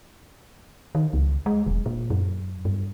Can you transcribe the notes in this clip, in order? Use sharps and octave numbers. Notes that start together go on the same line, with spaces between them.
D#3
C#2
G#3
E1
A#2
F#2
G2